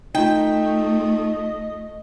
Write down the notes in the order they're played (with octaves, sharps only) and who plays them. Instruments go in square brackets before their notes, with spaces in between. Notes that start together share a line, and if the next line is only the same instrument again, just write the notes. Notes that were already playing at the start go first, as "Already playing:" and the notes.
[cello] A3 [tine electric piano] D#4 F4 [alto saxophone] D#5 [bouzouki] G5